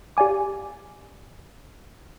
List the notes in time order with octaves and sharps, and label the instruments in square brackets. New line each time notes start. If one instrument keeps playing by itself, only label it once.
[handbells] G4 D5 F5 G#5 D6